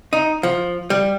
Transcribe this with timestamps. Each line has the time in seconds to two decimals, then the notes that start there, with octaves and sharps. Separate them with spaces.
0.13 D#4
0.43 F3
0.90 G3